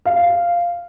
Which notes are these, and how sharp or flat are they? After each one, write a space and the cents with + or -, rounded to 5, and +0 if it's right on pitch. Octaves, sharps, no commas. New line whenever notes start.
F5 -5